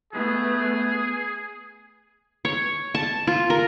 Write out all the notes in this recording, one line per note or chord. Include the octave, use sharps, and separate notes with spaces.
A3 B3 G#4
C#5
A5
F4
A#4